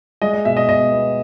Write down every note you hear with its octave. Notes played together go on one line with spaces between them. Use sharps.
G#3 D#5
D#5
B2 E5
D#5
B2 D#5
B3